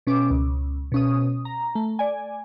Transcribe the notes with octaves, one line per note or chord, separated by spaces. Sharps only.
B2 C#4 D6
C#2
B2 C#4 D#6
A#5
A3
D5 G#5